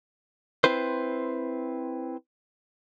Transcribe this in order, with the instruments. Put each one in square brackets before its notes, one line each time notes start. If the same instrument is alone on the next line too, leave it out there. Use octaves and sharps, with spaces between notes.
[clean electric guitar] C4 E4 B4 C5